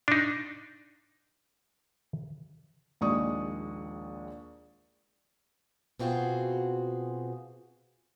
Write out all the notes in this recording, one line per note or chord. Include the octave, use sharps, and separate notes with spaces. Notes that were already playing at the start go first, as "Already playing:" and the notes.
D4 D#4
A#1 D#2 G#3 D5 C#6 D#6
B2 C4 F4 F#4 G#4